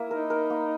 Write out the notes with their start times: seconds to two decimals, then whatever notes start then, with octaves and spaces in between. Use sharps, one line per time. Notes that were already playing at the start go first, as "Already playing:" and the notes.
Already playing: A#3 E4 E5
0.10 D#4 A#4
0.30 A#4
0.50 A#3